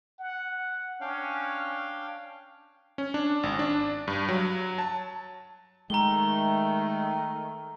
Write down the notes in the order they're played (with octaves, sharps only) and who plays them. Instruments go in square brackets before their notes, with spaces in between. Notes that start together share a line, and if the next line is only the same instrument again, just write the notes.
[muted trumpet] F#5
[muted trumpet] C#4 [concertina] D4 F5 G5
[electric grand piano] C#4
D4
G#1
D4
G2
F#3
A5
[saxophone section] D#3 A3 [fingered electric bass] G#3 [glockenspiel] A#5 G7